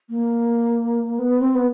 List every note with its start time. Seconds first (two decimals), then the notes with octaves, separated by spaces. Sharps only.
0.10 A#3
1.19 B3
1.40 C4
1.55 B3